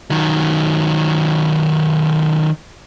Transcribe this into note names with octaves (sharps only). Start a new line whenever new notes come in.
D#3 F#3